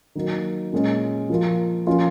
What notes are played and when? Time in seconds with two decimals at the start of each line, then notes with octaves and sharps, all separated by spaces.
0.15 D#3 F#3 A#3
0.73 A#2 G#3 C#4
1.30 F3 A#3 F4
1.87 F3 A#3 C#4 F4